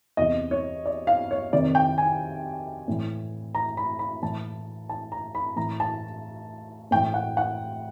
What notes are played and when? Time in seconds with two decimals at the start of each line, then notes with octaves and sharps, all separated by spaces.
0.17 E2 C3 E3 D#5
0.51 C#5
0.86 D5
1.07 F5
1.31 C#5
1.53 F2 C3 D#3 D5
1.75 G5
1.98 G#5
2.88 A2 E3
3.55 A#5
3.77 B5
3.99 B5
4.22 A2 E3 A5
4.89 A5
5.12 A#5
5.35 B5
5.56 A2 E3 A#5
5.80 A5
6.91 A2 E3 G5
7.14 F#5
7.37 F#5